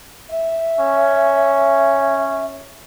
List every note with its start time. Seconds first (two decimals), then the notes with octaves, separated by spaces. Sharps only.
0.29 E5
0.80 C#4